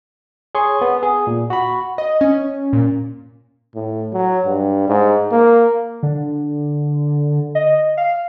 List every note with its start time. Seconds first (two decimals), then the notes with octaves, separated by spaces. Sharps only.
0.55 G#4 C#5 C6 C#6
0.81 B3
1.03 G#4
1.27 A#2
1.50 F#4 B5
1.98 D#5
2.21 C#4
2.73 A#2
3.75 A2
4.13 F#3
4.46 G2
4.88 G#2
5.32 A#3
6.03 D3
7.55 D#5
7.97 F5